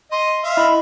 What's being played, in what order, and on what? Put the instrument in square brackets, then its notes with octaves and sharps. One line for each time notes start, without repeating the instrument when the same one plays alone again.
[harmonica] D#5 [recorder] C6
[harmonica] E5 F5
[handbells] E4 D#5 [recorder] B5